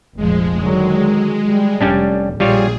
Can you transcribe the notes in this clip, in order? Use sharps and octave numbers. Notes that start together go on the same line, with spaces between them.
F1 A#1 F3 G#3
D3 D#3 F#3
G3
F1 G3 C#4 D4
A#1 G3 F4 G#4 C#5